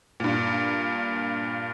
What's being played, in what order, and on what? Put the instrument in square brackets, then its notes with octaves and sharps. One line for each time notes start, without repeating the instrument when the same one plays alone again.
[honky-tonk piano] G2 A#2